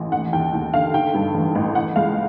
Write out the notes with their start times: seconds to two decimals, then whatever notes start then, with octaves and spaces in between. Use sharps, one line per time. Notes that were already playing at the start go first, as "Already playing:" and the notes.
Already playing: A1
0.12 D#2 F#5
0.33 D#2 G5
0.54 D#2
0.73 D3 F5
0.94 D#3 G5
1.14 G2
1.34 A1
1.55 A1
1.75 E3 F#5
1.96 C#2 F5